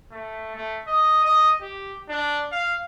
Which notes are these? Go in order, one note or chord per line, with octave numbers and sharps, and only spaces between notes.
A3
A3
D#5
D#5
G4
D4
F5